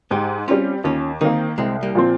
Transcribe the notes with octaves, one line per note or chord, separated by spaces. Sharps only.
G#2 D#4 G4
G3 C4 C#4 F4
D#2 C#4 F4
D#3 A#3 C4 D#4
C2 G#3 C4
G3 A#3
A#2 F3 C4